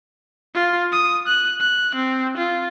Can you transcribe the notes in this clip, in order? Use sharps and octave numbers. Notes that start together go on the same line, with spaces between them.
F4
D#6
F#6
F#6
C4
F4